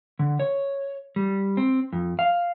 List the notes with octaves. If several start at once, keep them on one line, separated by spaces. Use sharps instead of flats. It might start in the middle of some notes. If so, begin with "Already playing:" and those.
D3
C#5
G3
C4
F2
F5